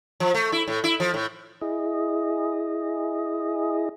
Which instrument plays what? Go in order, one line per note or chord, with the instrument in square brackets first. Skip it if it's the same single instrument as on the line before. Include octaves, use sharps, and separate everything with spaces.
[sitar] F3
A3
E4
A2
E4
F3
A2
[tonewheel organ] E4 G#4 D#5